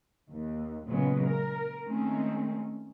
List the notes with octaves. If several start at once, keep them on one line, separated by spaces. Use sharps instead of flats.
D#2
A#2 C#3 F#3 G#3 B3
A#4
D#3 G#3 A3 C4 C#4